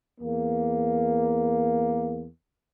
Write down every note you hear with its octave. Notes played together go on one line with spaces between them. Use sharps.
E2 A#3